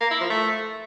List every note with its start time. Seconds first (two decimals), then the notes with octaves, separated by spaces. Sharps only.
0.01 A#3
0.11 E4
0.21 F3
0.30 A3